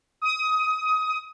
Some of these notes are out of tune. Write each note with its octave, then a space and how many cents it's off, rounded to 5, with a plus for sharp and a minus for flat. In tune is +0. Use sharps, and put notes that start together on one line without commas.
D#6 +20